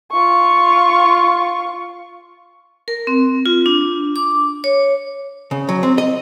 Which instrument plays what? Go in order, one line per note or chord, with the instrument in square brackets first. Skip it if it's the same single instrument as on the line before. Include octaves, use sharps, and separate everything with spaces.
[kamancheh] F4 C#6
[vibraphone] A#4
C4
F4
D4
D6
C#5
[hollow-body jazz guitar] C#3
F#3
C4
D#5